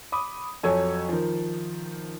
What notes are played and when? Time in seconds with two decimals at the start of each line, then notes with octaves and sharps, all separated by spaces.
0.12 B5 D6 D#6
0.63 F2 F#3 A4 C#5 G#5
1.09 D#3 F3